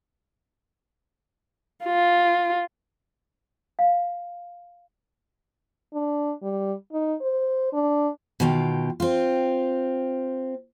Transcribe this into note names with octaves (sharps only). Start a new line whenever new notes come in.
F4
F5
D4
G3
D#4
C5
D4
B2 D#3 F4 G5
C4 F4